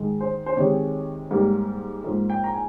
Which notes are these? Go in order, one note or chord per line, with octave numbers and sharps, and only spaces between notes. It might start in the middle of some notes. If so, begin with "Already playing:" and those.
Already playing: G#2 D#3 G#3
C5
C5
C3 D#3 G#3 C#5
G#2 G3 A#3
G#2 F3 A#3
G5
A#5
G#5